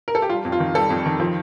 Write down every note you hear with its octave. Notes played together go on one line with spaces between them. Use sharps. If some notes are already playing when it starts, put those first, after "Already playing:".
A#4
A4
G4
G3 F4
F2
F4
D#3
G3 A4
F2
D#3
F3